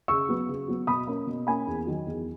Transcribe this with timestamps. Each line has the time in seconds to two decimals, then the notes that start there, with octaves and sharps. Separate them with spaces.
0.08 C#3 C#6 E6
0.29 F#3 B3
0.49 C#3
0.68 F#3 B3
0.87 B2 B5 D#6
1.07 A#3 C#4
1.27 B2
1.47 A#3 C#4 G#5 B5
1.67 E2
1.87 D#3 F#3
2.07 E2